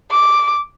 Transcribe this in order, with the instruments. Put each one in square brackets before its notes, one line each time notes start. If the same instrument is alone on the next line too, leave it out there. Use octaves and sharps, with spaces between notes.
[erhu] D6